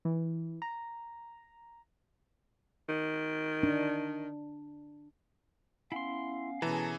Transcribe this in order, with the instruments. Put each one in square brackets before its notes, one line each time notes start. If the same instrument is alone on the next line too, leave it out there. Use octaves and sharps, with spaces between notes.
[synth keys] E3
A#5
[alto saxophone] D#3
[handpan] D4
[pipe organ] B3 C#4 F5 [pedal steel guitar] E4 C6
[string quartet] B2 C#4 G#4 [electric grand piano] E3 [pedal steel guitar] A4 A5 A#5